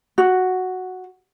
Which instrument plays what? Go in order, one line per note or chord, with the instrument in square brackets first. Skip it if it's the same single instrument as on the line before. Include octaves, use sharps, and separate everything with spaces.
[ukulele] F#4